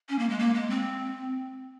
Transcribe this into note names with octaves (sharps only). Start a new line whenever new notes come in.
C#4
A#3
G#3
A#3
G#3
C4